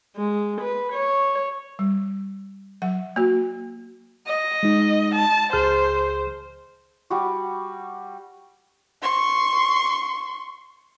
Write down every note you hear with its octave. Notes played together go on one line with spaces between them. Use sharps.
G#3
B4
C#5
G3
F#3 F#5
A#3 F#4
D#5
G#3 D#4
A5
C#2 G#4 C5 F6
G3 F#4
C6 C#6